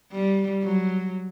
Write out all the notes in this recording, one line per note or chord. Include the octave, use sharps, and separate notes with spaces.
G3
F#3